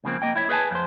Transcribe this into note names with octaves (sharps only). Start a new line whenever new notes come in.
C#2 C#3 F3 A#3 C4
A#3 D#5 G5
E4 C#5 E5
G#4 B4 D#5 G#5 A5
F2 C5